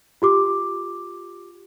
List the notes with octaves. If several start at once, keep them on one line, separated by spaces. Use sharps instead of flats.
F4 G4 D6